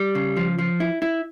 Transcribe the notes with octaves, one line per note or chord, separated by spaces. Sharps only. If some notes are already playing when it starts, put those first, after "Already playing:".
Already playing: G3
C#3
F3
F3
E4
E4